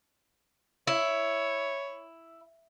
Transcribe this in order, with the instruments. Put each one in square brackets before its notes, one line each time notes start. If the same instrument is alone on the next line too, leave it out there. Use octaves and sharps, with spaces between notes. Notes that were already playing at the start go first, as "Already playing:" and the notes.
[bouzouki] E4 [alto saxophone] C#5